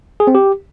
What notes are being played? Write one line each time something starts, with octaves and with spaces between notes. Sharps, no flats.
G#4
C4
G4